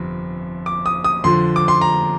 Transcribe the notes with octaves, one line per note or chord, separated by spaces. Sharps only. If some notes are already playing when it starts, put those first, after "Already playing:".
Already playing: G1 F2 C3
D6
D#6
D#6
F2 D3 F3 C6
D6
C6
A#5